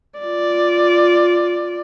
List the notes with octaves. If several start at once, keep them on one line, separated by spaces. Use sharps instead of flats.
F4 D5